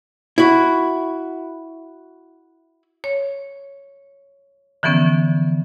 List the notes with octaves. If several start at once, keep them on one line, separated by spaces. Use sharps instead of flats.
E4 F#4
C#5
D3 E3 F3 B3 C#4